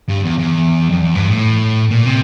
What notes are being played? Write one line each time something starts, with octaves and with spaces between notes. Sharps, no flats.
G2
E2
E2
F2
E2
G2
A2
A#2
C3